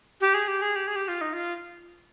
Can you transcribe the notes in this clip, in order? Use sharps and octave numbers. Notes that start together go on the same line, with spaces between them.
G4
G#4
G4
G#4
G4
G#4
G4
F4
D#4
F4